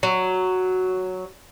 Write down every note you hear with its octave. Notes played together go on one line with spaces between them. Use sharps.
F#3